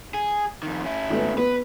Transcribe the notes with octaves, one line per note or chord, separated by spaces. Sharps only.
G#4
F2 D#3
C#4 E4
G#1 A3 B3
B3 B4